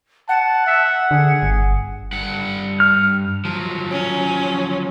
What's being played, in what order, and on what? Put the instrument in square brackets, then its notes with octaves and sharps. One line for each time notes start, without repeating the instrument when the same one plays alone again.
[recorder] F#5 [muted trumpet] A5
[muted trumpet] E5
[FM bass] D3 [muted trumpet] G#4
[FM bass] G1
[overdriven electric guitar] G2 F#5
[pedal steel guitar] F6
[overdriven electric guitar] F3 F#3
[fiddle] C#4